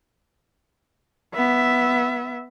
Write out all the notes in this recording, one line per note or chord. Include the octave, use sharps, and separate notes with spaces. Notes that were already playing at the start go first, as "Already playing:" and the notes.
B3 E5